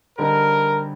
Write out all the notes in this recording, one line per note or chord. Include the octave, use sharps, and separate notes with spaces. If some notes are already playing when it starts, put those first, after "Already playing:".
D3 G3 C4 D#4 A#4